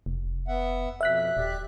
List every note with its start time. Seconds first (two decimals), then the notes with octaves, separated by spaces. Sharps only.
0.06 F1
0.48 B3 E5 F#5
1.01 F2 B2 E5 F#6 B6
1.37 D#1 G4 D5